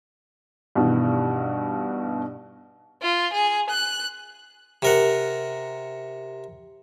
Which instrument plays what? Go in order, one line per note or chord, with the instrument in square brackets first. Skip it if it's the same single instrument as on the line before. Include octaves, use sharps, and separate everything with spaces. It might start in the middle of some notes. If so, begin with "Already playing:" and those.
[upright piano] G2 B2 D#3 E3 B3
[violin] F4
G#4
F#6
[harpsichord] C3 A#4 F#5